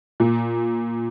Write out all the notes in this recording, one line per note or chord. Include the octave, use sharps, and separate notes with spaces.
A#2